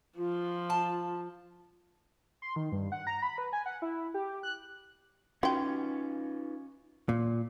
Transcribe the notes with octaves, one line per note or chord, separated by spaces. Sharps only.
F3 F4
A5
C6
D#3
G2
F#5
A#5
B5
B4
G#5
F#5
E4
G4
F#6
C#4 D#4 F4 F#4 B4 F#5 G5
A#2